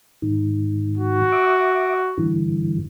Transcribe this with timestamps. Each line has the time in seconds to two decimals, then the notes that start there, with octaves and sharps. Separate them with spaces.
0.22 G#2 D#3
0.98 F#4
1.32 E5 D6
2.18 G2 D3 E3